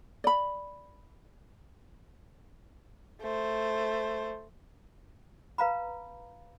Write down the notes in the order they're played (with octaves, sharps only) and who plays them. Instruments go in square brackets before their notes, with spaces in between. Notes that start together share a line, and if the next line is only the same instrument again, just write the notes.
[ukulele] D5 B5
[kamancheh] A3 C5
[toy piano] B4 F5 A#5 B5